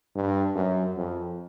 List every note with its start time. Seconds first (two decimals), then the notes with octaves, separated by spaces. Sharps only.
0.15 G2
0.55 F#2
0.97 F2